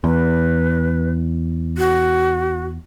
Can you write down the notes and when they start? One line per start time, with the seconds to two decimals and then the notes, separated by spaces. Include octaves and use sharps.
0.04 E2 B4
1.78 F#4